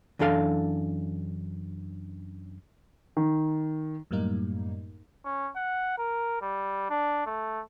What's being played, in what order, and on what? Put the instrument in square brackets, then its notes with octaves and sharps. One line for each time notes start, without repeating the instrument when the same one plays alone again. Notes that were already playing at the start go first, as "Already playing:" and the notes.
[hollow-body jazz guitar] F#2 E3 D4 A4 F5 C6
[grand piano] D#3
[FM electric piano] F#2 A2 G3 A#3 D#4
[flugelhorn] C#4
F#5
A#4
G3
D4
A3